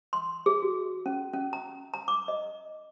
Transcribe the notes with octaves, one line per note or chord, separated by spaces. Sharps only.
C6
G#4
F#4
C#4
C#4
A#5
A#5
D6
D#5